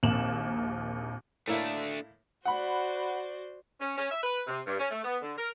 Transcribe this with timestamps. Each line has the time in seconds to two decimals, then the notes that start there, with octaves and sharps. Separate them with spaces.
0.03 A#1 D#2 A#3 C4 E7 F#7
1.47 A2 A3 A#3 D4 E4
2.45 F#4 C5 D5 F#5 B5
3.81 C#4
3.98 C#4
4.12 E5
4.24 B4
4.48 C3
4.67 G2
4.80 C#4
4.91 A3
5.05 B3
5.22 D3
5.38 A#4